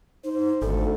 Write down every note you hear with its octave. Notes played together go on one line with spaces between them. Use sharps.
D#4 C5
G#1 D2 A4